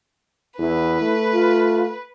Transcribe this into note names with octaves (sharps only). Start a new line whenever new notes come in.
E2 E4 B4
A3
F4